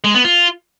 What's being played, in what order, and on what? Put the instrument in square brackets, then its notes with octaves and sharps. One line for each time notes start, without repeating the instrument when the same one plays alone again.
[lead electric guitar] G#3
B3
F4